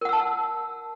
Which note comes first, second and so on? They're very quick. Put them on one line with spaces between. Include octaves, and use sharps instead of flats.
A#4 F#5 E6 A5